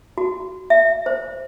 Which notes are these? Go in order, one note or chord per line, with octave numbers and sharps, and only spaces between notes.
F#4
E5
C5